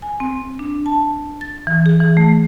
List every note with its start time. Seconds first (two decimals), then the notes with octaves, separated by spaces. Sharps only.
0.02 G#5
0.20 C4
0.59 D4
0.86 A5
1.41 A6
1.67 E3
1.86 G#4
2.00 E3
2.17 A3